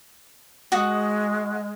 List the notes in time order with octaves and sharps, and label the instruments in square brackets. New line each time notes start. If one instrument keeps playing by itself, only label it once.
[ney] G#3 [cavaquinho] F#4 F#5 D#6